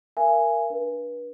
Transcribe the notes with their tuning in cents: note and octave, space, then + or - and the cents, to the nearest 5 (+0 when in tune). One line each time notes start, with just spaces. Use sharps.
A#4 +0 E5 +45 G#5 +0
D4 +0 B4 -35